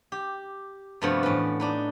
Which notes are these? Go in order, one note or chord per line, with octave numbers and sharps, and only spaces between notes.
G4
G2 C3 F3 A3 B3 F#4
E2 A2 C#4 B4
D4 D#4 B4